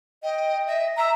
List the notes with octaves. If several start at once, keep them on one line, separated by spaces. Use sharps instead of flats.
D#5 G5
D#5 E5
E5 A#5